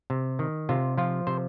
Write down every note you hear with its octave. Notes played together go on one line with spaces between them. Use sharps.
C3
D#3
C3 F4
F3 F4
C3 C5